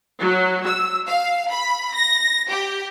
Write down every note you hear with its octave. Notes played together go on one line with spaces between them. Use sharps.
F#3
E6
F5
B5
A#6
G4